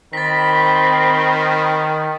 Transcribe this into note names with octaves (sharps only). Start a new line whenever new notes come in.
D#3 C4 B5 A6 B6